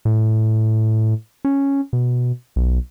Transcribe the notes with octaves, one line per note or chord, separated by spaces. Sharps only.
A2
C#4
B2
B1